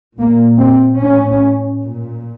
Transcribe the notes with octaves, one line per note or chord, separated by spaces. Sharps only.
A#2 A#3
C4
A2 C#4
A#2